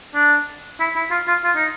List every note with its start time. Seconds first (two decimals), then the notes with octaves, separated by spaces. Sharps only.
0.15 D4
0.80 E4
0.96 E4
1.11 F4
1.28 F4
1.44 F4
1.56 D#4